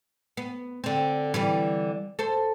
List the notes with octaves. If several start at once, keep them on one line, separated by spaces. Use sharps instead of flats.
B3
D3 C4
D3 E3 G3
A4 C5